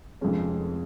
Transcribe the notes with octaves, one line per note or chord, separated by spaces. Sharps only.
F1 F2 F3 G#3 C#4